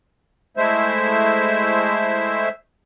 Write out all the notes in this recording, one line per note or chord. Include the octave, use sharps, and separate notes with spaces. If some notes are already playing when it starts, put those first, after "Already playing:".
G#3 A3 E4 C5 E5